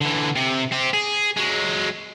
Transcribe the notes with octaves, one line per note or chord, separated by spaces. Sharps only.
D3 E3
C3
C4 G4
G#4
F#3 G#3